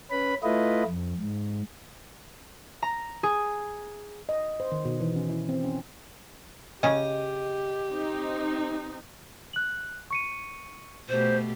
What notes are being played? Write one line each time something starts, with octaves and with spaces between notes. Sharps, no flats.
C#4 B4 B5
A3 E4 F4 B4 D#5
F2
G#2
A#5
G#4
D#5
C5
D#3
B2
E3
C#4
E4
C4
C#4
C#3 C#4 G4 D#5
C4 D#4
F#6 F#7
C#6 C#7 D#7
B2 A3 G4 C5